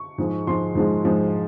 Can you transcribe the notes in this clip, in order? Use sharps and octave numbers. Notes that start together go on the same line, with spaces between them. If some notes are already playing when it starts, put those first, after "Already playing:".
Already playing: C#6
G#2 F3 G#3
G#2 F3 G#3 C6
G#2 F3 G#3
G#2 F3 G#3